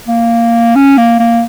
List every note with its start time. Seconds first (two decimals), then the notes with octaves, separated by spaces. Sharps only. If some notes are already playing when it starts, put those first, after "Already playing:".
0.08 A#3
0.75 C#4
0.97 A#3
1.19 A#3